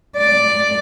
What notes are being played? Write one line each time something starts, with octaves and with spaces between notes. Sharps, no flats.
D5